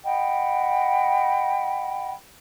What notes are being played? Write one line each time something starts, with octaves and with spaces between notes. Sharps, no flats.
D#5 F#5 G5 B5